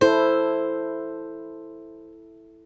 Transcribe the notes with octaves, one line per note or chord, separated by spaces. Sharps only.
E4 A4 C5